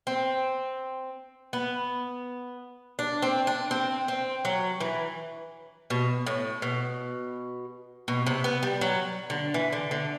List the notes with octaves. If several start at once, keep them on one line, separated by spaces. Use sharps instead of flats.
C4
B3
D4
C4
D4
C4
C4
F#3
E3
B2
A2
B2
B2
C3
B3
G3
F#3
D3
E3
D3
D3